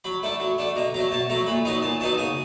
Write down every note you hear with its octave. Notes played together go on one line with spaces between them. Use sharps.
F#3 B5
A3 D4
F#3
A3 D4
B2 A#5
F#3 A3 A#5
B2 A5
F#3 A3 A#5
A#2 B5
F#3 B3 D#4 A#5
A#2 A5
F#3 B3 D#4 A5
C#3 G#5